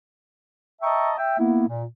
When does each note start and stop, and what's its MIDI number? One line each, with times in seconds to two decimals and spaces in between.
0.82 1.12 75
0.82 1.12 76
0.82 1.12 79
0.82 1.12 81
0.82 1.12 82
0.82 1.12 85
1.17 1.38 76
1.17 1.38 79
1.38 1.66 58
1.38 1.66 59
1.38 1.66 64
1.67 1.83 46